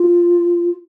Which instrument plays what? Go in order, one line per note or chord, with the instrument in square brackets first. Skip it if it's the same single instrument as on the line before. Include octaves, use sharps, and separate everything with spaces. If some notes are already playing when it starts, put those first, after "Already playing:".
Already playing: [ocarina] F4